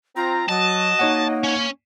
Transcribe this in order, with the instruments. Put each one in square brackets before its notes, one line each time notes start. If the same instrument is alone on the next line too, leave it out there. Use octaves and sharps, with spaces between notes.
[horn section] C4 A#5 [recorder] F4
[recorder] F#3 [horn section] F#4 D#5 [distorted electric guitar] A5
[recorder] A#3 [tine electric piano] D#4 C#5 F#5
[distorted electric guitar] C#4